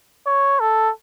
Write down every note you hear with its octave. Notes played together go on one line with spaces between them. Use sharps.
C#5
A4